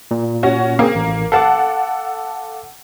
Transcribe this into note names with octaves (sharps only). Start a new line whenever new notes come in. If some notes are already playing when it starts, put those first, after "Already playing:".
A#2
C#4 F#4
A#3 C4 G#4
A1
A4 F5 F#5 A5 D6